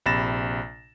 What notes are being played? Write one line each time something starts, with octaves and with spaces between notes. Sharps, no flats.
A#1 C3 B5 A6 A#6 E7